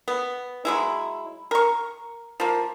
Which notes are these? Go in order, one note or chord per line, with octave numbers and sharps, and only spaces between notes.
B3
F#3 G#3 E4
A#4 C#6
F3 A#3